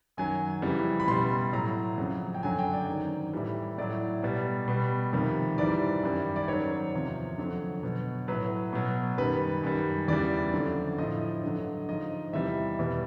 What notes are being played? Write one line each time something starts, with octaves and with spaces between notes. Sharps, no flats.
F#2 D#3 F#3 G#5
F2 C#3 E3 G3
B5
B2 G3 C6
A2 F#3 A#5
F2 C#3 F#3
G5
F#2 D3 F#3 G#5
G5
D5
G#2 D#3 F#3
A2 E3 G3
A2 F#3 D5
B2 G3
B2 G3
F2 C3 D#3 G3
G#2 E3 G3 D5
F#2 D#3 G3
D5
G#2 D#3 F#3 C#5
E2 C3 F3
F2 D3 F#3
B2 F#3
A2 F#3 B4
B2 F#3
F#2 D#3 G3 B4
F#2 D#3 G3
E2 C#3 E3 G3 D5
F2 D3 F#3
A2 F3 D#5
G2 D3 F#3
G#2 F3 D#5
E2 C3 E3 G3 E5
E2 B2 G3